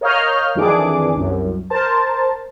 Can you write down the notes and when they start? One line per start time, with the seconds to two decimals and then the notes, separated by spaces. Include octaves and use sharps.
0.01 A#4 C#5 D#5 F5 F6 G6
0.55 F2 D#3 E3 D4 G#4 D6
1.16 C2 F#2
1.70 A#4 C5 A5